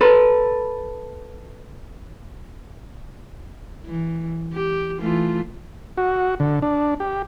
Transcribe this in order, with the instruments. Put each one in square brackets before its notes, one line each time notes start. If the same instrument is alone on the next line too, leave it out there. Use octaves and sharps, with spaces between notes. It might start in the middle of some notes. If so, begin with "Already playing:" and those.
[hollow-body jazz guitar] A4 B4
[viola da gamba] E3
G4
E3 A3 F4
[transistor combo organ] F#4
D3
D4
G4